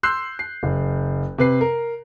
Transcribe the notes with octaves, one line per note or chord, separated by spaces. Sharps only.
C6 E6 F#6 G6 C7
C7
F#1
C3 B4 C7
A#4